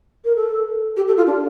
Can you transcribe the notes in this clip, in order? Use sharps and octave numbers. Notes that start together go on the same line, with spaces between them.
A#4
A4
G4
A4
F4
D4